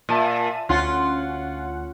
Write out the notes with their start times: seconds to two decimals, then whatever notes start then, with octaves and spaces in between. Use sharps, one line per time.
0.09 A#2 E5 A5 D#7
0.69 D2 C#4 F4 F#5